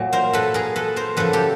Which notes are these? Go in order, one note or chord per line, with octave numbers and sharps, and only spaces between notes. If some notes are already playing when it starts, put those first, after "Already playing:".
Already playing: A#2 F#3
A#4 C5
A4 B4
G#4 A#4
A4 B4
A#4 C5
F#2 C#3 F3 A4 B4
G4 A4